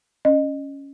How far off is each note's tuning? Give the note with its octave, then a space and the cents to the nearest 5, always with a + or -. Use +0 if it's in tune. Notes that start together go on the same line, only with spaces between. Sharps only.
C#4 +0 D#5 -20